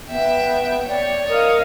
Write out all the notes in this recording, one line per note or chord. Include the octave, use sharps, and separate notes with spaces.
B3 E5 G5
C#5 D5
A#4 D#5 F5